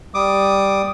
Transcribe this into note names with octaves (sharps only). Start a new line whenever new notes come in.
G3 D6 D#6